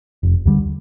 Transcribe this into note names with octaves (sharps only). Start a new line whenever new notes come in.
F1
D#2 D3 G3